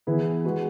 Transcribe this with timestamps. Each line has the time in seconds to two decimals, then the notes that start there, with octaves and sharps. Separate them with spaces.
0.07 E3 B3 E4 G#4 B4
0.44 G#3 B3 F#4 B4